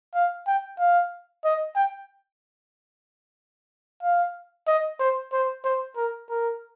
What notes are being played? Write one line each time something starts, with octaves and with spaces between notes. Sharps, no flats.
F5
G5
F5
D#5
G5
F5
D#5
C5
C5
C5
A#4
A#4